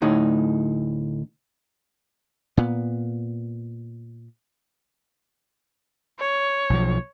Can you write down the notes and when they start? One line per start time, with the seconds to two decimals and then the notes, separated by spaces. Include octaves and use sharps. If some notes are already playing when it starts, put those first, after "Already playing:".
0.02 D2 A2 D#4
2.57 A#2 B3
6.19 C#5
6.70 B1 F3